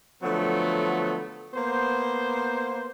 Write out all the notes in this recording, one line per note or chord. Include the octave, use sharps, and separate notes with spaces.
D3 F3 F#3 A3 B3
A#3 B3 C5